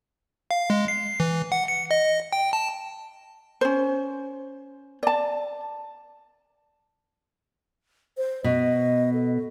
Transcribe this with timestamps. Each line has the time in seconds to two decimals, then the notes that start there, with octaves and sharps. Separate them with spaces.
0.51 F5
0.70 G#3
0.88 C7
1.20 E3
1.52 F#5
1.68 C#7
1.91 D#5
2.33 G5
2.53 A5
3.61 C#4 C5
5.03 D5 A5
8.17 C5
8.44 B2 D#5
9.13 A4